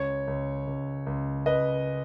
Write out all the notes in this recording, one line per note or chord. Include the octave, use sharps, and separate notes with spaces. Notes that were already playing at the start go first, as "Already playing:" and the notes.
Already playing: C#2 C#5
C#2
C#2
C#2
C#2 B4 D#5